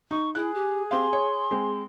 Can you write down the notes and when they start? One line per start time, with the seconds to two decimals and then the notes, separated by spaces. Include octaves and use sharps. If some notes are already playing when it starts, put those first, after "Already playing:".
0.11 D#4 C#6
0.35 E4 G#4 F#6
0.55 G4
0.91 C4 G4 F5 C6
1.13 C#5
1.51 G#3 C4